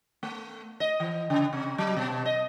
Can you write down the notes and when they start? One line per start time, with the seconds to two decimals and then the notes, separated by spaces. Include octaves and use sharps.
0.23 A3
0.80 D#5
1.00 E3
1.30 C#3
1.53 C3
1.78 F#3
1.97 B2
2.26 D#5